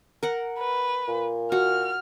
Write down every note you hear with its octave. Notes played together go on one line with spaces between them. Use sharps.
A#4 F#5
B4
A#2
F#4 F6